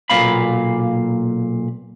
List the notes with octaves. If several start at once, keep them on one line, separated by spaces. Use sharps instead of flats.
B1 A#2 A#3 F5 B5